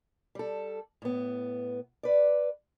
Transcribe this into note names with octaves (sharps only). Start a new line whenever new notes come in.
G3 A4
A2 B3
B4 D5